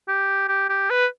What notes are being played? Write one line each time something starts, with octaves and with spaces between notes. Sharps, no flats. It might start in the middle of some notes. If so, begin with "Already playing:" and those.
G4
G4
G4
B4